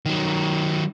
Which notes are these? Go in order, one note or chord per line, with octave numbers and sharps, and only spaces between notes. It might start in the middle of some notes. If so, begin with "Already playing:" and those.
D#3 F#3